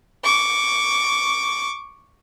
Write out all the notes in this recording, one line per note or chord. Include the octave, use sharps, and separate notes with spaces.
C#6 D6